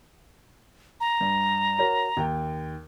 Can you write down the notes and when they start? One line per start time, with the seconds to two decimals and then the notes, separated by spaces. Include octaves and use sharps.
1.00 A#5
1.21 G2
1.78 F#4 A#4 C#5
2.17 D#2 G5